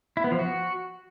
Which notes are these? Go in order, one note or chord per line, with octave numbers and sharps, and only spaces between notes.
E4
B3
F3
F#4